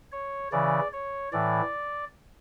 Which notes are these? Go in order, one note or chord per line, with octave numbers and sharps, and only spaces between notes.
C#5
C#3 E3 D5
C#5
A2 E3 D5